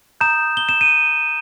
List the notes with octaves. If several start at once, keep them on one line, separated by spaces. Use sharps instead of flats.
A#5 D#6 G6 E7
G7
E7
D#7